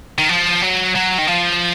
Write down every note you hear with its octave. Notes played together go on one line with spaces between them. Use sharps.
D#3
F3
F#3
F#3
D#3
F3